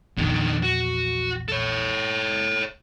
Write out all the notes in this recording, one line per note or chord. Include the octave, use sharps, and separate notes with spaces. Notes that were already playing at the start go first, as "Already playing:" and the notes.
A#1 E2 D3 D#3
F#4
A4 C#5